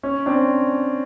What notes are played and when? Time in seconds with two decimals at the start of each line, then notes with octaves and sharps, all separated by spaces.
0.03 C#4
0.26 C4 D4